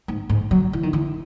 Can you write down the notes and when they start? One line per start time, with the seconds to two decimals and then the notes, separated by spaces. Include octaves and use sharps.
0.08 G#2
0.30 G#2
0.51 F#3
0.73 E3
0.83 D#3
0.93 E3